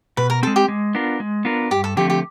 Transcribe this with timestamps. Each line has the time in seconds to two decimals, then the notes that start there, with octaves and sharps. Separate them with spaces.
0.17 B2 B4
0.30 A#4
0.43 C4 A4
0.47 G#3
0.56 G4
0.68 G#3
0.95 B3 D4 F4 A#4
1.20 G#3
1.45 B3 D4 F4 A#4
1.71 G2 G4
1.84 A4
1.97 D3 F3 A3 C4 G4
2.10 G4